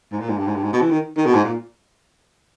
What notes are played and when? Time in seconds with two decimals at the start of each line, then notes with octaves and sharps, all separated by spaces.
0.12 G#2
0.20 A#2
0.29 G#2
0.38 G2
0.47 G#2
0.55 G2
0.63 G#2
0.73 B2
0.81 E3
0.91 D#3
1.17 D#3
1.26 B2
1.35 G#2
1.44 A#2